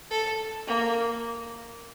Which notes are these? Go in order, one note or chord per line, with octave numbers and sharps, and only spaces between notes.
A4
A#3